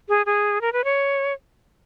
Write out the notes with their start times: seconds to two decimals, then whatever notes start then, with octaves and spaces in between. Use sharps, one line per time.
0.09 G#4
0.26 G#4
0.61 A#4
0.73 B4
0.84 C#5